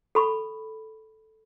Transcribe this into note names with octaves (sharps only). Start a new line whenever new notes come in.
A4 B5 C#6